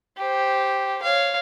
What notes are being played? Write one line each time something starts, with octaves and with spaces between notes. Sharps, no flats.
G4 C5
C#5 F5